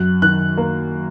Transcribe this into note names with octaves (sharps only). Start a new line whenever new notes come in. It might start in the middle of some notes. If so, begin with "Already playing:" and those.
Already playing: F#2 F#6
D#3 F#6
A#3